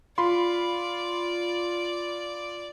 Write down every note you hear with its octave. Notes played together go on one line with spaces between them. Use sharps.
F4 D5 B5 C6